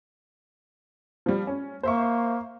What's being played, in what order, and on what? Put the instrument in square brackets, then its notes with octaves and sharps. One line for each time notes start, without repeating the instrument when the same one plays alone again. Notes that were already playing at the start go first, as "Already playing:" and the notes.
[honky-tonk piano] F3 G3
C#4
[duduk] A#3 [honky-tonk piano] C5 E5 C#6